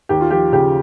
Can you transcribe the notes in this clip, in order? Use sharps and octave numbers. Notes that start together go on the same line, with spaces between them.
D#2 G4
F4
F3 G4
C#3 G4